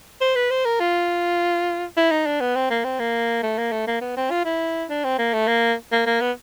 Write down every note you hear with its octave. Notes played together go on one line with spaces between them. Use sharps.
C5
B4
C5
A#4
F4
E4
D#4
D4
B3
C4
A#3
C4
A#3
A3
A#3
A3
A#3
B3
C4
F4
E4
D4
C4
A#3
A3
A#3
A#3
A#3
B3